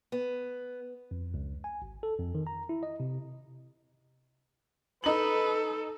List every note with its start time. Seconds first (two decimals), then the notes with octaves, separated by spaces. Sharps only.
0.12 B3
1.11 F2
1.34 C#2
1.64 G#5
1.82 G#1
2.03 A4
2.19 F2
2.35 D#3
2.47 A#5
2.69 E4
2.83 D#5
3.00 C3
5.04 D#4 A4 B4 F#7